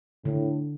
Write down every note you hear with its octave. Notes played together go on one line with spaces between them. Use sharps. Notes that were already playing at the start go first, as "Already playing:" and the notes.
A2 D3